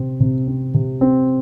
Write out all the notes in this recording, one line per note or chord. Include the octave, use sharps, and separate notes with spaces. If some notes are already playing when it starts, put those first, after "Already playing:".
Already playing: C3 C4
C3
C4
C3
C4